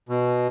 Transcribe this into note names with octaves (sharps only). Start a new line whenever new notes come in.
B2